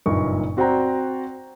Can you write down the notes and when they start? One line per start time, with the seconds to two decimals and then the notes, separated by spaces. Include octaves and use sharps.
0.06 F#1 G2 A#2 A#3 D#4 C#6
0.57 C4 F#4 C5 D5 G5 A#5